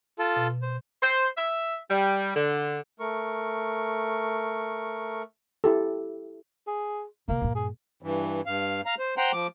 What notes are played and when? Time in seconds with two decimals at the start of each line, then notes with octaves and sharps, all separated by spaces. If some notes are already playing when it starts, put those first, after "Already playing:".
0.19 F4 A4
0.36 B2
0.62 C5
1.02 C5
1.37 E5
1.90 G3
2.36 D3
3.00 A3 A#4 C#6
5.64 E4 G4 A4
6.67 G#4
7.28 D2 C3 A#3
7.41 G2 A#2
7.55 G#4
8.02 G2 E3
8.46 G2 F5
8.86 F5 A#5
8.99 C5
9.17 C5 F#5 G5 A#5 C6
9.33 F3 D6